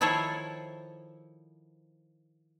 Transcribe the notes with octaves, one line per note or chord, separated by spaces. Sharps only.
D#3 F3 E4 A4 C5 C#5